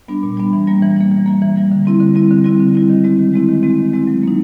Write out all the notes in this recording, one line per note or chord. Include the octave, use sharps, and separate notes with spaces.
G3 B3 D4
A#2
G3 B3 D4
E3
G3 A#3
E3
G3 A#3
E3
G3 A#3
E3
G3 A#3
D3
G3 C4 E4
D3
G3 C4 E4
D3
G3 C4 E4
D3
G3 C4 E4
D#3
G#3 C4 E4
D#3
G#3 C4 E4
D#3
G#3 C4 E4
D#3
G#3 C4 E4
F#3
A#3 D#4